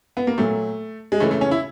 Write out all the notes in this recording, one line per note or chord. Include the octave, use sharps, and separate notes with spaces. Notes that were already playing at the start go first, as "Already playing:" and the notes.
B3
A#3
A#2 F#3 A3
G#3
C#3 E3 A3
A3
C#4
E4